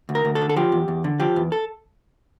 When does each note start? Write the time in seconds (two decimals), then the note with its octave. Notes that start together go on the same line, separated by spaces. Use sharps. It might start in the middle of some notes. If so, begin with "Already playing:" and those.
0.09 D2
0.15 A#4
0.25 D2
0.35 A4
0.41 D3
0.49 A4
0.56 F3 G4
0.72 E2
0.88 E2
1.04 D3
1.20 F3 G4
1.36 E2
1.52 A4